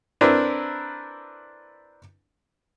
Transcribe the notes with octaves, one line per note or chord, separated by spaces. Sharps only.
C4 D4 E4 A#4 B4